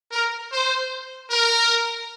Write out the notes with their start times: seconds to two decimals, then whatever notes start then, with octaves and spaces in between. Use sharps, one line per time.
0.12 A#4
0.51 C5
1.29 A#4